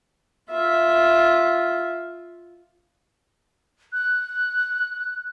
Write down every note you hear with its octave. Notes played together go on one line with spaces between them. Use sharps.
F4 E5
F#6